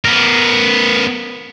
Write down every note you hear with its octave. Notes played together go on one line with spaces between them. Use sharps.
B3 A#4